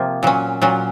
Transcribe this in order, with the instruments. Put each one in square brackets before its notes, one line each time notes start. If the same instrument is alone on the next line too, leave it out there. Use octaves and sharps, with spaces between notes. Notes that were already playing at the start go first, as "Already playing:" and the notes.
Already playing: [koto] C3 F3 A#3
A#2 F#3 C#4
A#2 F#3 C#4